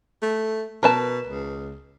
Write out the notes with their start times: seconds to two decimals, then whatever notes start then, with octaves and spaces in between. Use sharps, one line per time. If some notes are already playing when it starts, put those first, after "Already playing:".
0.22 A3
0.83 B2 A#4 B4 A5
1.26 C#2